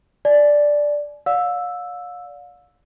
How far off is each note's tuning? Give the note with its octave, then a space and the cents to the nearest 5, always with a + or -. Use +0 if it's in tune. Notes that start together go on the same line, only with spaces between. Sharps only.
D5 +0 G#5 +35
D5 -25 F5 +40 E6 +0